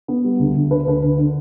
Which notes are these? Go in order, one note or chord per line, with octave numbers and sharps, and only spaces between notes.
B3
G3
D2
D2
D3 B4
D2 B4
D3
D3